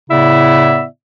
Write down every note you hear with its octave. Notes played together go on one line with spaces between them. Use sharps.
A2 C#3 B3 E4 D5 E5